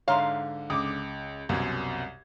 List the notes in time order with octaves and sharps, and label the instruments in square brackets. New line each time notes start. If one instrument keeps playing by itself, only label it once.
[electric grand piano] G#2 D3 [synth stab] C#5 A#5 C6 [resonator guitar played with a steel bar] F5
[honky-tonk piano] C#2 [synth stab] D6 D#6
[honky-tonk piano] C2 [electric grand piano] F#2 B2 G#6